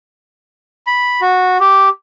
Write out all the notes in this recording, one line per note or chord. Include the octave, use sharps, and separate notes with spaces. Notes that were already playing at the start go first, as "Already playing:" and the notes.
B5
F#4
G4